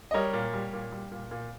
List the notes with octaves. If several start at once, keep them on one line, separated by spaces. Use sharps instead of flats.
D#5
G3 A#4 C#5
A#2
G3
A#2
G3
A#2
A#2